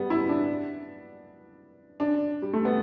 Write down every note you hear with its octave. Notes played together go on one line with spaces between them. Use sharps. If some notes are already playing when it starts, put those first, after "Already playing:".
Already playing: G3 B3
E4
D4
D4
G3
A3
B3